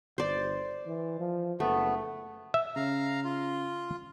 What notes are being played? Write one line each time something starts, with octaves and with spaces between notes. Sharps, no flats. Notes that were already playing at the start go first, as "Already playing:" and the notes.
G1 C5 D5
E3
F3
F#1 A3 B3
E5
C#3 F5 A#5
F4